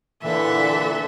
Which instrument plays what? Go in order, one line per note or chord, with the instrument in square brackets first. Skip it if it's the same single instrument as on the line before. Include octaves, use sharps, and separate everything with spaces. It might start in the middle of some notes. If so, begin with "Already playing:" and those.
[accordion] A#2 D3 E3 [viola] A4 E5